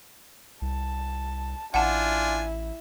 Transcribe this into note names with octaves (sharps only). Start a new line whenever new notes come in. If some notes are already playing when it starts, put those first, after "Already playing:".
C2 A5
A1 D4 E4 F4 F#5 G#5 A5